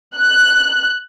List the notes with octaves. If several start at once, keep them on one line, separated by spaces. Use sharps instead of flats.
F#6